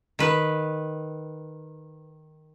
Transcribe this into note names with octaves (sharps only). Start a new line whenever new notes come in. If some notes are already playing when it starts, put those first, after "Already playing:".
D#3 B4